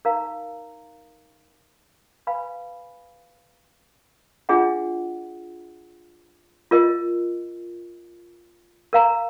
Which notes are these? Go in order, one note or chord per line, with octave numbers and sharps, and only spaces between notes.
D#4 A#4 F5 A#5
B4 F5 G#5 B5
D4 F4 G#4 D#5 F#5
F4 A#4 D#5
A#4 F5 A#5